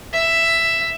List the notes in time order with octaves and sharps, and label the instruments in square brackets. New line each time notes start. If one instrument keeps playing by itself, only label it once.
[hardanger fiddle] E5